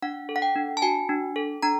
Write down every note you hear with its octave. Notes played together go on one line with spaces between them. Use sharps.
D4 F#5
A4
F#5
G5
D4
A5
F#4 G#5
D4
A4
D4 A#5